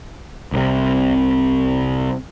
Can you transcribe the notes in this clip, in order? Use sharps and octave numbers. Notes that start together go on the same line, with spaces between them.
C2 C3